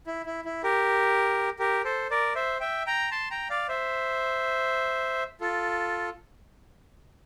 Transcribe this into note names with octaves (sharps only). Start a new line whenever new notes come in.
E4
E4
E4
G4 A#4
G4 A#4
A4 C5
A#4 D5
C5 E5
E5 G5
G5 A#5
A5 C6
G5 A#5
D5 F5
C5 E5
F4 A4